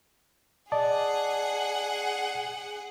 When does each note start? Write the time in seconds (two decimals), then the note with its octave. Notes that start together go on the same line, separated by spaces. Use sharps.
0.72 G#4 D5 D#5 F#5 A5